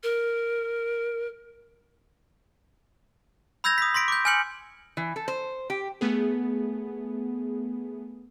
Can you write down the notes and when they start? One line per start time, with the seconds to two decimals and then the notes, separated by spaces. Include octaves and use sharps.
0.03 A#4
3.64 B5 E6 G6 G#6 A#6 F7
3.78 D#6 B6
3.94 C6 A#6 B6 D7
4.08 D6 G6
4.25 G#5 F6 G6 C#7 F#7
4.97 E3
5.16 A4
5.28 C5
5.70 G4
6.01 A3 B3 G#4